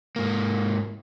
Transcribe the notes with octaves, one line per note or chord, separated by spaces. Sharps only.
G#2 A#3